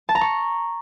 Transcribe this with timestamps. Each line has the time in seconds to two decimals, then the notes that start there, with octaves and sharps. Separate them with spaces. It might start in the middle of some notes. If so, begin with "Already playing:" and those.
0.09 A5
0.15 A#5
0.21 C#6